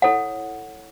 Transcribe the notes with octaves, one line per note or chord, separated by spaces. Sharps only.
E4 A4 C#5 F#5